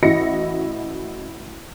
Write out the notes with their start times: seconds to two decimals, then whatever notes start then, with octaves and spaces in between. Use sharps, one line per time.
0.02 A1 E4 F#4 D#5 A#6 C#7